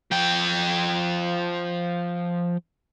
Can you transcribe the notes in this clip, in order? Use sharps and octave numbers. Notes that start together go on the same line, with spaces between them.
F3 G5